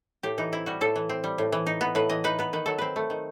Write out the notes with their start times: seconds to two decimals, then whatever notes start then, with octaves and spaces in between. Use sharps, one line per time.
0.23 A2 G4
0.38 E3 D#4
0.52 C4 E4
0.66 G3 F#4
0.81 A2 A4
0.96 E3
1.09 C4
1.24 G3
1.38 A2
1.52 E3
1.66 D#4
1.81 B3
1.95 A2 B4
2.09 E3 D#5
2.24 D#4 B4
2.39 B3 B4
2.53 D#3 B4
2.66 F#3 A4
2.78 C4 B4
2.96 A3
3.10 D#3